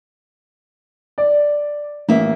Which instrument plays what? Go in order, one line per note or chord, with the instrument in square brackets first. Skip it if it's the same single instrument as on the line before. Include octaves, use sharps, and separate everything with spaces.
[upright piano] D5
[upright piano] A1 [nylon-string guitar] A#3 E5